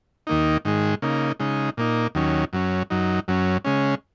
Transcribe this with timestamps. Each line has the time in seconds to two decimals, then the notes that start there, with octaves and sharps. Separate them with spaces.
0.27 D#2 D#3 A#3 D#4
0.65 G#2 D#3 G#3
1.02 C#3 A#3 D#4
1.40 C#3 G#3 D#4
1.77 A#2 A#3 D#4
2.15 D#2 D#3 F#3 C#4
2.53 F#2 F#3 C#4
2.90 F#2 F#3 D#4
3.28 F#2 F#3 C#4
3.65 C#3 G#3 C#4